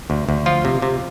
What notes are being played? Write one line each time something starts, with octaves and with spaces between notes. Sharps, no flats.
D2
D2
F3 F4
C3
C3